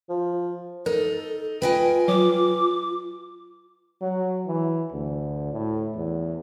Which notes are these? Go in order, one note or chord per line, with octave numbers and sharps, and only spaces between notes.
F3
D#4 A4 A#4
F4 B4 D#5 G5 G#5
F#3 D6
F#3
E3
D2
A2
E2